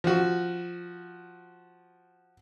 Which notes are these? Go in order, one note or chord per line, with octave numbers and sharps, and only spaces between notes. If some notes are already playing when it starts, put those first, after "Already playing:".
F3 F#4